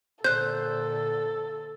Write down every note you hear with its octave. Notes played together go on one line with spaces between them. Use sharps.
A#2 D3 A4 C5 F#6 G6